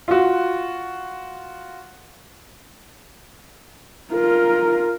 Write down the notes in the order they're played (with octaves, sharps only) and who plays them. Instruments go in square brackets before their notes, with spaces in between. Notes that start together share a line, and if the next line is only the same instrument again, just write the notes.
[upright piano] F4 F#4
[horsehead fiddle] F4 A#4